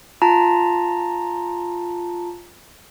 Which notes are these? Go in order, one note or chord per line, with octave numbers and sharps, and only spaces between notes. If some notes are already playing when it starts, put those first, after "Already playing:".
F4 A5 A#5